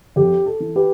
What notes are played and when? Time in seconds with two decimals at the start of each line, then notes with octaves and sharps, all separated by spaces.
0.16 F2 G4
0.46 A4
0.60 E3
0.76 G4 B4